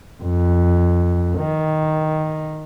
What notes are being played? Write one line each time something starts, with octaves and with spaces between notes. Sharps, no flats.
F2
D#3